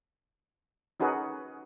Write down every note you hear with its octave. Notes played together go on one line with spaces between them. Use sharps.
C#4 D#4 F#4 G#4 A#4 B4